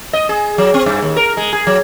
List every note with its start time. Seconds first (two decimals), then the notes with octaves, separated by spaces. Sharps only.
0.13 D#5
0.29 G#4
0.58 F#3
0.74 C4
0.86 G2
1.02 D#2
1.16 A#4
1.37 G#3
1.53 G#4
1.67 F#3